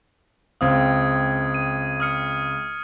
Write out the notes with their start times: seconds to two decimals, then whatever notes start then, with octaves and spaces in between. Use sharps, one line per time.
0.61 C#2 C4 F5 D#6 G#6
1.54 D#7
2.00 D#6 F6 C#7